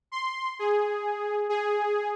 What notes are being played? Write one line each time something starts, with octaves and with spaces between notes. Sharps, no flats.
C6
G#4
G#4